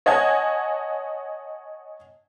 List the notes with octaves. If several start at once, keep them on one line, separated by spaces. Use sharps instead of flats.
C#5 D#5 F#5 G#5 A5 G#6